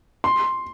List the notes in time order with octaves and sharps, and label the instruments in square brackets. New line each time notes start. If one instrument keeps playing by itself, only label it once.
[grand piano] C6